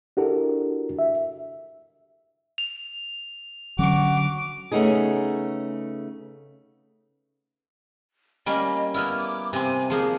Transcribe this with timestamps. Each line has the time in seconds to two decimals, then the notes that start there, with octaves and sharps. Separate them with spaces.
0.17 D4 E4 F#4 G4 A4 A#4
0.99 E5
2.58 F7
3.79 D3 F#3 C#4 F#4 D6
4.72 C#3 A3 B3 D#4 G#4
8.46 G3 A#3 C#4 D#5
8.94 A#3 B3 E4 F6
9.18 D6
9.53 C3 C4 G#5
9.90 F3 A#3 D#4 G#4